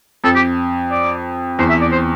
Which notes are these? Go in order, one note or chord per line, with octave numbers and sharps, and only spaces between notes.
F2 A4
G4
D5
E2 C5
E5
D5
C5